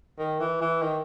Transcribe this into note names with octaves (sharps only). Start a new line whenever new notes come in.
D#3
E3
E3
D#3